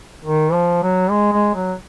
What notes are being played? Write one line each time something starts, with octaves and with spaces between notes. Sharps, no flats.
D#3
F3
F#3
G#3
G#3
F#3